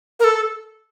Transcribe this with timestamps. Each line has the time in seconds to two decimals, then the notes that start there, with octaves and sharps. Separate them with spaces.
0.20 A#4
0.24 A4